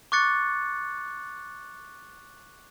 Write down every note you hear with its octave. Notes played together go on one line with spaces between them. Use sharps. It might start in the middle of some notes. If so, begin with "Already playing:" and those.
C#6 D6 F#6 A6 C#7